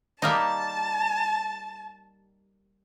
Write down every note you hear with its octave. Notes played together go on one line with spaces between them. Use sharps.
G3 A#3 D#4 A5